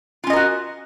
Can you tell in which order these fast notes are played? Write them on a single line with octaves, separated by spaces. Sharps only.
F4 C#4 D#5 A#4 F#4